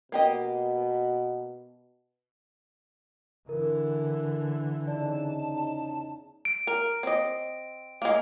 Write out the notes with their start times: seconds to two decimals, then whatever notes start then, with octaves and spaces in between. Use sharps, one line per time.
0.12 B2 A#3 G4 D#5
3.49 D3 E3 A#4
4.87 E2 C#3 D#4 D5 A5
6.45 D7
6.67 A#4
7.03 C4 D#5
8.02 G#3 A#3